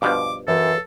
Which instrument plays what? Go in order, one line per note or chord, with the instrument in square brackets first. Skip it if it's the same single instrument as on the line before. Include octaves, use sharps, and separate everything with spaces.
[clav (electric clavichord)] G2 B2 F3 [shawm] D6
[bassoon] F#2 [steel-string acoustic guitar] E3 F5 [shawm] A4